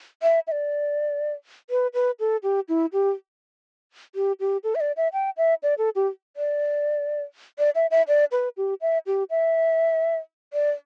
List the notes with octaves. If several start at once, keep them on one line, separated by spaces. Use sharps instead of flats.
E5
E5
D5
B4
B4
A4
G4
E4
G4
G4
G4
A4
E5
D5
E5
G5
E5
D5
A4
G4
D5
D5
E5
E5
D5
B4
G4
E5
G4
E5
D5